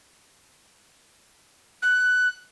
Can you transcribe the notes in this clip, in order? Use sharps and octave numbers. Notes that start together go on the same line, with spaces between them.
F#6